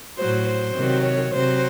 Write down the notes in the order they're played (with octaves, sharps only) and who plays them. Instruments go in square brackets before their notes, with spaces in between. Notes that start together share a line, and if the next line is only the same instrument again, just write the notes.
[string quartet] A2 F#3 C5
C5
C3 D#3 F#3
C#5
C3 F#3 C5